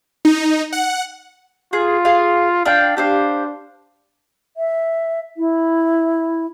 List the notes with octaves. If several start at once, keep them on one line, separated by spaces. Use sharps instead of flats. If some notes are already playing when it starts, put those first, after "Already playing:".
D#4
F#5
F4 G#4
G#4 F5
D4 F5 G5
D4 G4 C5 F5
E5
E4